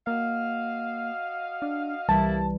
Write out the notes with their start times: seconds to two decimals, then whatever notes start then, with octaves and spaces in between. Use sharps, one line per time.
0.07 A#3 F#4 D#5 F5
1.62 D4
2.09 C2 C3 E3 G3 A#3 E4 A5